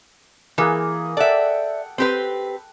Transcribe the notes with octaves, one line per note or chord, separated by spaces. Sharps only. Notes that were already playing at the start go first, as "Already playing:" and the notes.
E3 A#3 G#4
A4 D5 E5 F#5 G5
C4 G4 B4